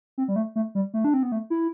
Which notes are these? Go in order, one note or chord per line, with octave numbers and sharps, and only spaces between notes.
C4
G3
A3
A3
G3
A3
D4
C4
B3
A3
E4